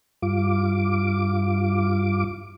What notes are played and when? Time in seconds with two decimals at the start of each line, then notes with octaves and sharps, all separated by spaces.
0.22 G2 F4 D6